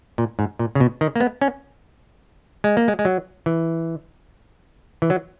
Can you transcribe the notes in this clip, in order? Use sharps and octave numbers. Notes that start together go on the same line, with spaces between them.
A#2
G#2
A#2
C#3
B2
D#3
A#3
B3
C#4
G#3
A#3
G#3
G#3
F#3
E3
E3
F#3